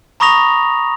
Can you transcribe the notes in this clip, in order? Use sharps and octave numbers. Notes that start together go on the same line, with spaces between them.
A#5 B5 C#6 D#6 A#6 F7